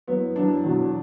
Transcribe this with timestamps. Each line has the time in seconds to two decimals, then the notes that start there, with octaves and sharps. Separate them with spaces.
0.08 F#2 E3 B3
0.36 F#2 E3 D4
0.64 E2 B2 F#3